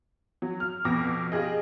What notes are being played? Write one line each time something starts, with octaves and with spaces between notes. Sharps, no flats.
F#3
F6
F2 B2 D6 A#6
F4 G4 G#4 D#5